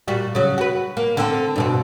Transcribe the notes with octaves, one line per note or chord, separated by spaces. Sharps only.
A#2 G3 F#4
C#3 F#3
F#4 B4
A#3
D3 C4
G2 B2 C4